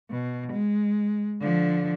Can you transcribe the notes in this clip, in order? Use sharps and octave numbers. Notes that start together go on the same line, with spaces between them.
B2
G#3
D3 F3